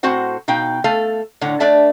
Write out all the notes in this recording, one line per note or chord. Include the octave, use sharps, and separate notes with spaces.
A2 C4 F#4 C5 F#5
B2 D#4 F5 G5
A3 A4 F5
A2 D3 C#5 F#5
A3 D4 D5 E5 A5